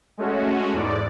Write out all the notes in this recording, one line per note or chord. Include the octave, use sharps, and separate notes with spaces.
G#3 A3 C#4 F#4
E2 G#2 D5